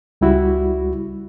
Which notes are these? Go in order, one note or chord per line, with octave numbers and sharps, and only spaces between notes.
C#2 G3 E4 F#4